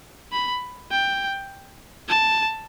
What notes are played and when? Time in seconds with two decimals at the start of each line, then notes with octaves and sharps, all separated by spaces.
0.32 B5
0.91 G5
2.09 A5